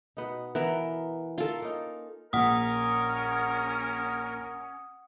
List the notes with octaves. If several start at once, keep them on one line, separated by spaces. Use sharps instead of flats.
B2 B3 D#4
E3 B3 A#4
F4 A4 A#4 F5
A#3 C#4 D#4
A#1 C#4 A#4 F#5 D#6